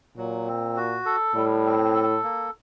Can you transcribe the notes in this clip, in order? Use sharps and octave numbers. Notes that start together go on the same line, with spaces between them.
A#2 F#3
C4
F#4
A4
A2 G3
C4
A4
A#3